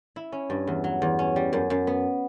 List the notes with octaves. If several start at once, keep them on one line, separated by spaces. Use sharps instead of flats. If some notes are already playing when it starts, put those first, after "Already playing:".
E4
C#4
G2
E2
F#3
E2
C#4
G3
F#2
F#2
B3